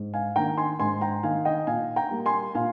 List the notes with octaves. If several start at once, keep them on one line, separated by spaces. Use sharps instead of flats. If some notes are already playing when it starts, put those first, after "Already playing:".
Already playing: G#2
F5 G#5
D#3 A#3 D#4 G5 A#5
G#5 C6
G#2 G#5 C6
G5 A#5
D#3 A#3 D#4 F5 G#5
D#5 G5
A#2 F5 G#5
G5 A#5
G3 A#3
G#5 C6
A#2 F5 G#5